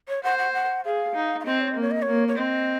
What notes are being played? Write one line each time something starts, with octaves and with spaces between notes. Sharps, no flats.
C#5
C5 F#5
F#5
F#5
G#4 F5
D#4
F5
C4 D#5
C#5
A#3 D#5
C#5
D#5
A#3 C#5
C#5
C4 D#5